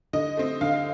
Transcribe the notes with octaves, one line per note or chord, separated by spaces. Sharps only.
D3 D#5
A3 C4
D3 F5